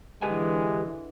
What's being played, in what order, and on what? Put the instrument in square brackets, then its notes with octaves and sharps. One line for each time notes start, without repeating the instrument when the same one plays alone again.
[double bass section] D3 E3 [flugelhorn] G#3 [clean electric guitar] G4 B4 G#5